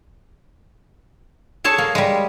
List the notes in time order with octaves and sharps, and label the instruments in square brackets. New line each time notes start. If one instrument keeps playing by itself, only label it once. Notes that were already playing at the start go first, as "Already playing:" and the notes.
[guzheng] G#4 A4 C#5 A5
A#3
G3 G#3